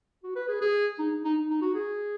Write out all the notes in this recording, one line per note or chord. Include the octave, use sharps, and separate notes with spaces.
F#4
B4
G#4
G#4
D#4
D#4
D#4
F#4
G#4